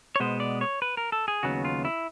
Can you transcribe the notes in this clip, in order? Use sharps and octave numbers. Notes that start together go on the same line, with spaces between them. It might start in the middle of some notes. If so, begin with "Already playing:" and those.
C#5
B2 G#3 B3 C5
D5
C#5
B4
A#4
A4
G#4
D#2 C#3 F#3 B3 F#4
F4
E4